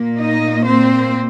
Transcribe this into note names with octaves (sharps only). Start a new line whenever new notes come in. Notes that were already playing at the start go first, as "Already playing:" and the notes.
Already playing: A#2 A#3
D#4 D#5
C4 C5